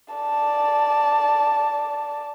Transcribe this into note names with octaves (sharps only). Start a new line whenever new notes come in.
D5 A5